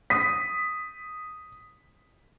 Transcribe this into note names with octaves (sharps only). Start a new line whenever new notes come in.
D#6 B6